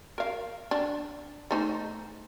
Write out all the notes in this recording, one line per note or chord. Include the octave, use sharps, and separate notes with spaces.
A#4 F5
D4
A3 D#4 C5